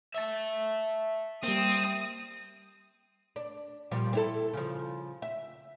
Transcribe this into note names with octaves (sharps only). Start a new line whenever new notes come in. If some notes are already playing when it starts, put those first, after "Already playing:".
E5 A5
G3 A#3 C4 D#6
D4
A#2 F3 G3
C4 E4 A4
C#3 F3
E5